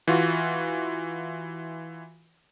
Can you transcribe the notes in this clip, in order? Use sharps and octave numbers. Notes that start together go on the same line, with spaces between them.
E3 F4 F#4